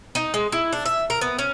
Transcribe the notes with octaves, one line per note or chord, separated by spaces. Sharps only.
D#4
G#3
E4
D4
E5
A#4
B3
C#4